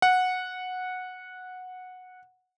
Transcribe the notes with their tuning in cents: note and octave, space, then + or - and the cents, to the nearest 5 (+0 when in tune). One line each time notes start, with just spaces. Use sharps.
F#5 -10